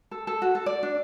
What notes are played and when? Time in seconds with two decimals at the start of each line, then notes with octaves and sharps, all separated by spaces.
0.11 A4
0.27 A4
0.42 F#4
0.55 A4
0.66 D5
0.83 D4